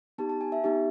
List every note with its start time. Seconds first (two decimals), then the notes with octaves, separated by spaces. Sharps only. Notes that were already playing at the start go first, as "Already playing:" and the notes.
0.18 B3 D#4 G4 A5
0.29 A5
0.41 G#5
0.52 E5
0.64 B3 D#4 G4